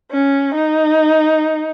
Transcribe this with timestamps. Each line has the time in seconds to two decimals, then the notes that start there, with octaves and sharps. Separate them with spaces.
0.11 C#4
0.54 D#4